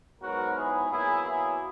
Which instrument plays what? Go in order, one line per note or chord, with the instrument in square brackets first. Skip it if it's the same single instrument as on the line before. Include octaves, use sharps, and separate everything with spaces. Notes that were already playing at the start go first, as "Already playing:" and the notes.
[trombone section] G#2 F#3 B3 F#4 A#4
E4 G#4
B2 F#3 A#3 E4 G#4
E4 G#4